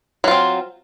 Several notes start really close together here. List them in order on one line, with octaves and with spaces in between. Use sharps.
F#3 F4 C4